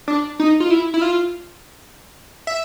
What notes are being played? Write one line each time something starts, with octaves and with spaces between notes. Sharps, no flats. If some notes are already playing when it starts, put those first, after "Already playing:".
D4
D#4
F4
E4
E4
F4
E5